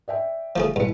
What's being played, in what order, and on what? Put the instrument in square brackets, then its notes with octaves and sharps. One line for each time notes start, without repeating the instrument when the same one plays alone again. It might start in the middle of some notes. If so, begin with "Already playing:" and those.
[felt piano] D5 E5 G5
[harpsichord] F3 A3 G#4
[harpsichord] G2 [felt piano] B2 E3 C#7